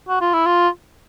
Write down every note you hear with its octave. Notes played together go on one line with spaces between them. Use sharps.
F#4
F4
E4
F4